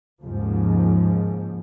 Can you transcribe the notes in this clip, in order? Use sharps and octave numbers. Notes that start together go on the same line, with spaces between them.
D#2 G#2 C#3 F3